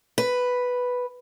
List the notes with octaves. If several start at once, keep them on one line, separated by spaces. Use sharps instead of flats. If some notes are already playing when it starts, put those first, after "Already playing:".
B4